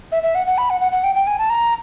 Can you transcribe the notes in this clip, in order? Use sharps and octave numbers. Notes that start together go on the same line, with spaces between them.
E5
E5
F#5
F#5
B5
F#5
F#5
F#5
G5
G5
G#5
A5
A#5